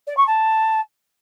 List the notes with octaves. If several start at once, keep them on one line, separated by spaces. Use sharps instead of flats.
D5
C#6
A5